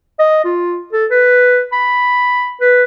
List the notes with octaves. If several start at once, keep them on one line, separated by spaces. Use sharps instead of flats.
D#5
F4
A4
B4
B5
B4